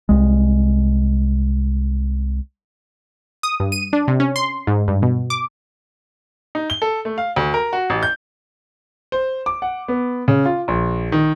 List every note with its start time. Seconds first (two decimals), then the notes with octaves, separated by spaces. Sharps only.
0.09 C2 G#3
3.43 D#6
3.60 G2
3.72 D#7
3.93 D4
4.08 C3
4.20 C#4
4.36 C6
4.67 G#2
4.88 G2
5.02 B2
5.30 D6
6.55 D#4
6.70 G7
6.82 A4
7.05 A3
7.18 F5
7.36 D2
7.54 A#4
7.73 F#4
7.90 A1
8.03 G6
9.12 C5
9.46 D6
9.62 F#5
9.88 B3
10.28 C#3
10.46 F4
10.68 A#1
11.12 D#3